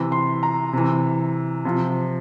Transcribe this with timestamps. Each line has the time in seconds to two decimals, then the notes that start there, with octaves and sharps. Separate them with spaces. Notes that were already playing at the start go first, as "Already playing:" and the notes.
Already playing: C3 E3
0.12 C6
0.43 A#5
0.73 C3 E3
1.65 C3 F3